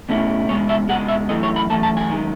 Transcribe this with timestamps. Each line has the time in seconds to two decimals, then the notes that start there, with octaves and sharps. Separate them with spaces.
0.09 B2 A3 C#4 E4
0.48 C#2 B2 G#3 C#5
0.69 E5
0.89 C#2 B2 G#3 F#5
1.08 E5
1.29 F#2 E3 A3 D#5
1.43 C#5
1.56 B5
1.70 F#2 E3 A3 A5
1.83 A5
1.97 G#5
2.09 F#2 D#3 G#3